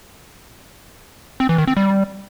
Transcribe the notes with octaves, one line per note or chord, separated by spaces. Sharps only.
C4
E3
D#3
C4
G3